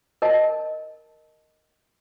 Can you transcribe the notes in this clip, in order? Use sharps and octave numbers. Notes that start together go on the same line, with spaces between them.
A#4 D#5 A5